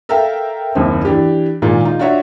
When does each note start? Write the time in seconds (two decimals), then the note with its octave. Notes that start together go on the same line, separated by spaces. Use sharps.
0.09 A4 A#4 E5 F5 G5
0.75 F#1 D#2 C4
1.05 E3 D4 G4
1.62 A#2 D#3 G#3 A#3 F4
1.85 D#4 F4
1.99 D4 F4 F#4 C#5 E5